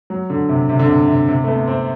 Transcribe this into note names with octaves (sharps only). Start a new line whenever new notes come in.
F#3
D3
C3
C3
D3
C3
C3
C3
A3
B3
C4